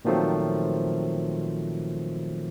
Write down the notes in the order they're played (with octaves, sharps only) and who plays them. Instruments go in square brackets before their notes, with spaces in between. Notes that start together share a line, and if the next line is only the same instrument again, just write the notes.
[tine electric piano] A#2 D#3 F3 F#3 A3 C4